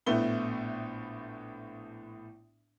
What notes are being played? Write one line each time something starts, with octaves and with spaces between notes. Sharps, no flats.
A#1 A2 A3 B3 G7